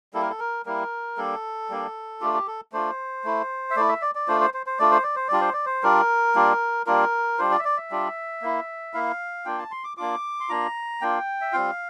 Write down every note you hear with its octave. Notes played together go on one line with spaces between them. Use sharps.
G3 A#3 E4 A4
A#4
A4
A#4
G3 A#3 E4 A#4
G3 A#3 D4 A4
G3 A#3 D4
A3 D4 F4 G4
G4
A4
A3 D4 F4 C5
A3 E4
E5
A3 E4 D5
E5
D5
D5
A3 D4 F4 C5
C5
C5
C5
A3 D4 F4 D5
C5
D5
C5
G3 D4 F4 D5
C5
D5
C5
G3 D4 F4 A#4
G3 A#3 D4 F4
G3 A#3 D4 F4 A#4
G3 D4 F4 C5
D5
E5
D5
E5
G3 D4 F4
A#3 E4
A#3 E4 F5
A#3 D4 F4 G5
A5
C6
D6
A#3 D4 F4 D6
C6
A#3 D4 F4 A#5
A#3 D4 F4 G5
E5
G3 C4 F4 F5